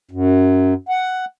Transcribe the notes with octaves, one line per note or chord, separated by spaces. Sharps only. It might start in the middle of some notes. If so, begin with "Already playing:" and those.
F#2
F#5